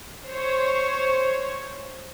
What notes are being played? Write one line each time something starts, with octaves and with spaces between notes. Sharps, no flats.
C5 C#5